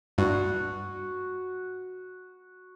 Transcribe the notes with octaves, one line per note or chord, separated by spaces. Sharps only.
G2 F#4